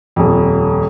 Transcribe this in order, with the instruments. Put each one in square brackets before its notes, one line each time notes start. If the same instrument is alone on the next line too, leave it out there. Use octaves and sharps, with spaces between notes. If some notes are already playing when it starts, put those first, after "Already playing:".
[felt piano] D#1 F2